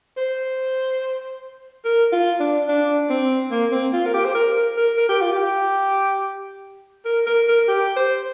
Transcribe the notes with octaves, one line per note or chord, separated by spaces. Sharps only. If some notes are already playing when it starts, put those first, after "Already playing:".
C5
A#4
F4
D4
D4
C4
A#3
C4
F4
A#4
G4
C5
A#4
A#4
A#4
A#4
G4
F4
G4
A#4
A#4
A#4
G4
C5